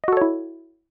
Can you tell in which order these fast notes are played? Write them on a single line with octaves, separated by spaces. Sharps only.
D#5 F#4 A4 C#5 E4